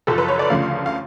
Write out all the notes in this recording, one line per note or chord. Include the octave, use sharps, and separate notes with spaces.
F#1 F#2 F3 A4
B4
C#5
D5
D2 C#3 F3 A3 F5
F5